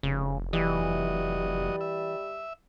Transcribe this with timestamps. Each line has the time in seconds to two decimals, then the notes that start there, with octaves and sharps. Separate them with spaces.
0.03 F1 C#3
0.53 E3 F#3 G3 D#5
1.81 E5